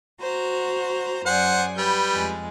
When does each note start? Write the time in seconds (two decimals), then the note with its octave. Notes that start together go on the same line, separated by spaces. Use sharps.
0.21 F#4 C5 A#5
1.26 F#2 G#4 C5 D5 F#5
1.78 G3 B4 G6
2.13 F2 G#3